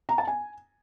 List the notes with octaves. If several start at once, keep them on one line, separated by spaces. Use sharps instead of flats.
A#5
A5
G#5